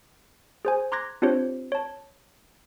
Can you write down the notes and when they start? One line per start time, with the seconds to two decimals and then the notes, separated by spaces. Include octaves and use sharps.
0.65 G#4 C5 G#5
0.92 A#5 C6 D6 F#6 G#6 A#6
1.22 C4 D4 F4 G4 C5 C#5
1.72 C#5 A5